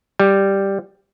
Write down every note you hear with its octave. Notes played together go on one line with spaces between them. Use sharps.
G3